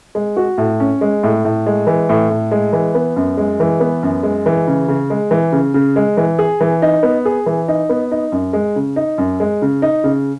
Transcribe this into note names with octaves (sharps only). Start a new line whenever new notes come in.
G#3
F#4
A2
C#4
G#3
A2
A2
G#3
E3
A2
A2
G#3
E3
B3
F#2
G#3
E3
B3
F#2
G#3
E3
C#3
C#3
G#3
E3
C#3
C#3
G#3
E3
G#4
E3
D#4
B3
G#4
E3
D#4
B3
D#4
F#2
G#3
C#3
D#4
F#2
G#3
C#3
D#4
C#3